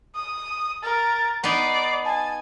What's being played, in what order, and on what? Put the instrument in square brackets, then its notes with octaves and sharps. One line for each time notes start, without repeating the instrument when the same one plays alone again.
[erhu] D#6
[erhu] A#4 [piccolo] A6
[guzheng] B3 D#4 [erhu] D5 [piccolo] C7
[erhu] G#5 [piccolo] A5